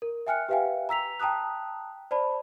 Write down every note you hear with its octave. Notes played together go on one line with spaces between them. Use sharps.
A#4
E5 G5 G#5 F6 F#6 C#7
G4 B4 E5 F5 G5 G#5
A#5 E6 B6 F7
G5 A5 A#5 D#6 F#6
C5 D5 A5 B5